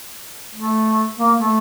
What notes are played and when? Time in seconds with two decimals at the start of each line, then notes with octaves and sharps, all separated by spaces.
0.55 A3
1.19 A#3
1.36 A3